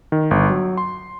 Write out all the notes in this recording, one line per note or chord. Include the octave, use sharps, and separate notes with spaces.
D#3
G1
F#3
C6